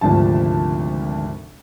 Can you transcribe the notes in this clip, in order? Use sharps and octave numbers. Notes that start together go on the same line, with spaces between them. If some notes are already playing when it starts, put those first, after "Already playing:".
G#1 D2 C3 F3 A5